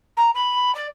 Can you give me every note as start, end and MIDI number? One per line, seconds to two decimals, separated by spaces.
0.16 0.30 82
0.34 0.73 83
0.74 0.86 74